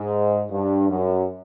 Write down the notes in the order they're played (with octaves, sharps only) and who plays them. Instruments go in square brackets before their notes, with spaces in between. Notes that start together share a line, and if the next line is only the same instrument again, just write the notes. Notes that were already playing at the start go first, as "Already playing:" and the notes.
Already playing: [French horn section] G#2
G2
F#2